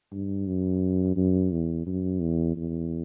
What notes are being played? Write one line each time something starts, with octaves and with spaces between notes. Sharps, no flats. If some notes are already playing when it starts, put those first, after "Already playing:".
G2
F#2
F#2
E2
F#2
E2
E2